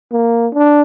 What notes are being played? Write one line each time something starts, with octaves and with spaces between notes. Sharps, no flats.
A#3
D4